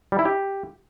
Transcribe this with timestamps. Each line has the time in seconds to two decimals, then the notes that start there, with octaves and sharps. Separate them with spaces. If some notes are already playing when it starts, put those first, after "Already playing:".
0.12 G3
0.19 E4
0.25 G4